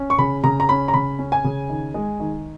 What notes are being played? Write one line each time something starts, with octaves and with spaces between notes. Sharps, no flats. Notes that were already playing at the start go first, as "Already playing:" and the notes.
Already playing: C#4
C#6
C#3 B5
C#3 A#5
A#5
C#4 B5
A#5
C#3 B5
C#4
G#5
C#3
D#3
G#3
D#3